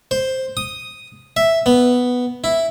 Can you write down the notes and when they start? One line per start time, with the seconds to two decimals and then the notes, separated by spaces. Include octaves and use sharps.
0.11 C5
0.57 D#6
1.37 E5
1.66 B3
2.44 E4